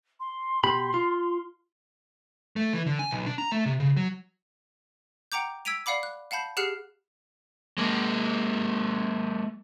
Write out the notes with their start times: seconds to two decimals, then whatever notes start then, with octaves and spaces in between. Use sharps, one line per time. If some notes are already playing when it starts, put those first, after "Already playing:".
0.20 C6
0.64 B2 G4 B5
0.94 F4
2.56 A3
2.73 E3
2.86 D3
2.99 G#5
3.11 B1
3.26 D4
3.38 A#5
3.52 A3
3.66 C3
3.80 C#3
3.97 F#3
5.32 F#5 G5 A#5 D6 G6
5.65 E6 G#6 B6 D7 D#7 F7
5.86 D5 F5 F#5 B5 D6
6.03 F#6
6.31 F5 F#5 A5 B5 G6
6.57 G4 G#4 F#5 F6 F#6 C7
7.78 G#3 A#3